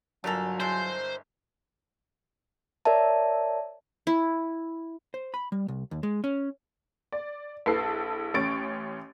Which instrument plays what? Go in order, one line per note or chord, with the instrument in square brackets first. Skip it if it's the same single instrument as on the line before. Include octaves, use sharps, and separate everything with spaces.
[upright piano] G1 A#4 F7 [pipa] D3 A4 [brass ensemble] F#3 F4 G#5
[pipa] E3 G#3 A4 [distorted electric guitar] C5
[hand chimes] A#4 C#5 D5 E5 A5
[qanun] E4
[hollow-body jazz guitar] C5
B5
G3
C2
D#2
G#3
C#4
[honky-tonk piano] D5
A#1 E4 A4 B4 A5 C7
A1 C#4 C#6 A6 D7